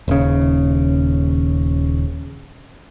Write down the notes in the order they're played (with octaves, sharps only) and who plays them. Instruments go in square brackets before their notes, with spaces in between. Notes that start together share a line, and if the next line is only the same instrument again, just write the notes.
[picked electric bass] D#1 C#3